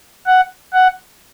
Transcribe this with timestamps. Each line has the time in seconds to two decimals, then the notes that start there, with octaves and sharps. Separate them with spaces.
0.26 F#5
0.73 F#5